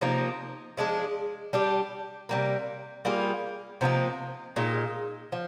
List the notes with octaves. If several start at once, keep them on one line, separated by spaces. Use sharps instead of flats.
C3 F3 A#3 D#4
F3 G#3 D4 G#4
G3 D4 G4
C3 G3 A#3
G3 A#3 F4 G#4
C3 F3 A#3 D#4
A#2 G#3 D#4 G4
F3